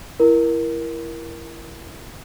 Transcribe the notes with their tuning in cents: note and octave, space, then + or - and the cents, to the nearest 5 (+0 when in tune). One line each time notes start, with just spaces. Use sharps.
E4 +20 A#4 +15